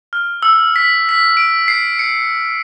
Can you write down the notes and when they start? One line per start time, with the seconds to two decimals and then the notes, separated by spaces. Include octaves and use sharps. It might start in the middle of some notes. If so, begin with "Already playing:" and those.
0.13 F6
0.43 E6
0.76 B6
1.09 B6
1.37 D7
1.68 C7
1.99 C#7